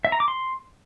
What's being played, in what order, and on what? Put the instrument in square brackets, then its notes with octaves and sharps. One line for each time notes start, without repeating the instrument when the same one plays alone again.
[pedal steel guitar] E5
A#5
D6
C6